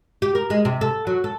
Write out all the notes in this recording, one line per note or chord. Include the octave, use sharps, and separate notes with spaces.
G4
A#4
G#3
C3
A4
F#3
A4